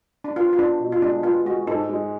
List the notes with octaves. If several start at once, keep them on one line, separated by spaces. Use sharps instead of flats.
D4
B3 F4
F4
B3 D4
B2
F4
G#3 D4
B3 F4
G#3 F#4
G#2 A4
G#3